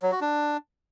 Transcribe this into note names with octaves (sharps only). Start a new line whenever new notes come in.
F#3
F#4
D4